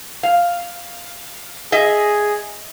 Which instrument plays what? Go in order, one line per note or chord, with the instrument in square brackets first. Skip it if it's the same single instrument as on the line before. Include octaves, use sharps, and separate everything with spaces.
[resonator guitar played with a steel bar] F5
[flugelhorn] G#4 [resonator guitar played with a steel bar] D#5 E5